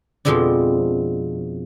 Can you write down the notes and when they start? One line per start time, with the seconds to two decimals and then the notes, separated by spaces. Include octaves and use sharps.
0.25 F2 B2 F3 G#3 C4 D4